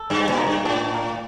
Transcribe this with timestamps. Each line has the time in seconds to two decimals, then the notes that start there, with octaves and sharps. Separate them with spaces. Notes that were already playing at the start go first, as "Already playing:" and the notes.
Already playing: A4
0.10 G2 G3
0.29 A#2
0.37 A#3
0.47 G2
0.65 A2 D4
0.94 A#3